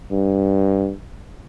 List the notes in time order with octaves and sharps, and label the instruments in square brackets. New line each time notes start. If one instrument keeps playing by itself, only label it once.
[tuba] G2